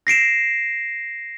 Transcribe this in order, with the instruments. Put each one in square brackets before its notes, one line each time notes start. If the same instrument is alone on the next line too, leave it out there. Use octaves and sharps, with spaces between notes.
[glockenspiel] A#6 C7 D7 E7